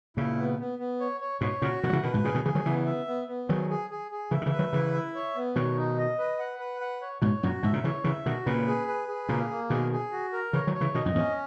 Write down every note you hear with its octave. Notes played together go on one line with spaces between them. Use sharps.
A#2 C#3 E4
B3
B3
B3
C#5
C#5
G#2 B2 C#5
A#2 C#3 F#4
B2 D#3 F#5
F#3
C#3 E3
B2 D#3 B4
G#2 B2
A#2 C#3 G#4
B2 D#3
C#3 E3 G#4
D#3 F#3
C#3 E3 B3
E5
B3
B3
D#3 F#3 G#4
G#4
G#4
G#4
C#3 E3 E5
D#3
C#3 E3
B4
D#3 F#3
C#3 E3 E4
E5
C#5
B3
B2 D#3 C#5
D#4
D#5
B4
F#5
B4
F#5
C#5
G#2 B2 C#5
F#2 A#2 F#4
G#2 B2 E5
A#2 C#3
C#3 E3 C#5
C#3 E3 E5
B2 D#3 F#4
A#2 C#3 B4
G#4
B4
G#4
A#2 C#3 A#3
A#3
B2 D#3 G#4
G#4
F#4
A#4
C#3 E3 C#5
D#3 F#3
C#5
C#3 E3
B2 D#3 D#5
F#2 A#2
E2 G#2 C#4